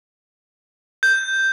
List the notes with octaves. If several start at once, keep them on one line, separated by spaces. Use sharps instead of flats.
G6